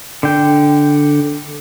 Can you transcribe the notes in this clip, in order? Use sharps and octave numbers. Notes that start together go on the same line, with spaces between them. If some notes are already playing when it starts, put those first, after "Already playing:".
D3 G5